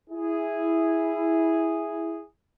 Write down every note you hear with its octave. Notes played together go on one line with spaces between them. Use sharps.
E4 G#4